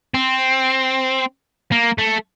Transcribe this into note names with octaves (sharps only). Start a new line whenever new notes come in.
C4
A#3
A3